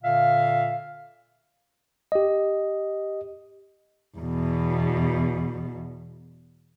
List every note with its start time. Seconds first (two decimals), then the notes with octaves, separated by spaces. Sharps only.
0.04 A#2 D3 E5 F5
2.12 G4 D#5
4.17 E2 B2